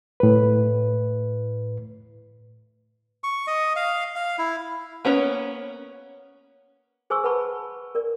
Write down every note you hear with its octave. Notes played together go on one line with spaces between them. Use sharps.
A2 B4
C#6
D#5
F5
F5
E4
A#3 B3 C#4 C#5
G#4 C5 G#5 C6 C#6 E6
B4 F#5 A5 B5 C#6
A#4 D5